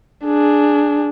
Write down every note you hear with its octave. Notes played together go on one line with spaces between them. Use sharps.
D4 G#4